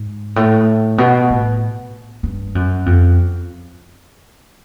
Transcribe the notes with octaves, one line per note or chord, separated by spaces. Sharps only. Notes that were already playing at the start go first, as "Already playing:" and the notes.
Already playing: G#2
A2
B2
A2
G2
F#2
F2